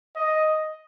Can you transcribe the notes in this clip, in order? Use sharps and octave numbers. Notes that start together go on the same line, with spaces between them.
D#5